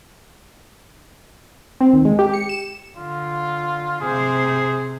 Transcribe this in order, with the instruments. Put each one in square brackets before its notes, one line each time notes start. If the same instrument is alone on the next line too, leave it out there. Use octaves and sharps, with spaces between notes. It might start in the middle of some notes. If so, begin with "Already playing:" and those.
[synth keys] C4
D#2
G#3
G4
C#7
E7
[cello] D3 [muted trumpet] F4
[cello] C3 C5 [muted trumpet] G#4